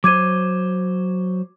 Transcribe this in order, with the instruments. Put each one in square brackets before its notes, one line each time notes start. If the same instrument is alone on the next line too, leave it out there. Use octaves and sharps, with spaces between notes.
[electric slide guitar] F#3 C5 [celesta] D6 G#6 D#7